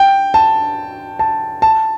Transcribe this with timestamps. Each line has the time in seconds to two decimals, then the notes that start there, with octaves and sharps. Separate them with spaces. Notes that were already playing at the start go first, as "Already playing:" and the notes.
Already playing: G5
0.34 A5
1.19 A5
1.62 A5